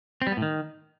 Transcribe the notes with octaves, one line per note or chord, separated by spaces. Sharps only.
C4
G3
B3
A2
D#3